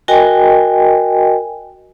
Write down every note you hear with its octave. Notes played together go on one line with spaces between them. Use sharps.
F#4 A#4 D#5 G5 G#5